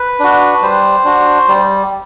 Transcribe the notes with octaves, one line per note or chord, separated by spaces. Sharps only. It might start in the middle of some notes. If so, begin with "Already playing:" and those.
Already playing: B4
D4 F#4
G3 C5
D4 F#4
G3